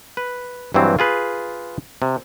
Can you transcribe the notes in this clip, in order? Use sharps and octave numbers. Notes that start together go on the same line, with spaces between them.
B4
G2 E3 F#3 C4
F4 G#4 B4
C3